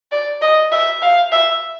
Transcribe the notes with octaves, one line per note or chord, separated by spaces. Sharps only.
D5
D#5
E5
F5
E5